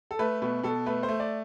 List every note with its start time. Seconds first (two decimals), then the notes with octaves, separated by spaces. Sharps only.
0.11 A4
0.19 A3 B4
0.42 B2 B4
0.63 B2 A4
0.86 A3 B4
1.03 C5
1.08 A3
1.20 D5